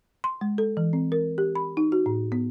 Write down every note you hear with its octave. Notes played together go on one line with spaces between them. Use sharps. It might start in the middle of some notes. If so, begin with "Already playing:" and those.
C6
G#3
A4
E3
C4
A#4
G4
B5
D#4
F#4
A2
B3